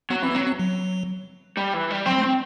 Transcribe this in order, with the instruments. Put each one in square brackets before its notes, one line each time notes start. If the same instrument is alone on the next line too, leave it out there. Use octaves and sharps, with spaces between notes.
[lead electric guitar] F#3 [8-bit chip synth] B3
[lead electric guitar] E3 [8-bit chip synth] C4
[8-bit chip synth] B3
[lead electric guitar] F#3 [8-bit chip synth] C4
[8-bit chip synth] C4
F#3
[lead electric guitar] G3
E3
G3
[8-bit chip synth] F#3 [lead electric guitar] C4
[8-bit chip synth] A3
[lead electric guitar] C4